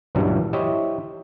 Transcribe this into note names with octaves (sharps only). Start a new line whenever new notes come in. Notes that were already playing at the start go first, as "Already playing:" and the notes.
C#2 G2 A#2 E3 F#3 G3
E4 G4 C5 C#5 D#5 E5